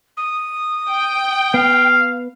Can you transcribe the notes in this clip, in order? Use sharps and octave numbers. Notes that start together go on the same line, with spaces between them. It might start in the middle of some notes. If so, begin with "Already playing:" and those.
D#6
G5
B3 F5